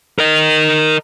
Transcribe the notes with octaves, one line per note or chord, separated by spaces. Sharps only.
A#4 D#5